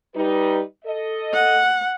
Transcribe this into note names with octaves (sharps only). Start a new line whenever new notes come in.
G3 D#4 B4
A4 D#5
F#5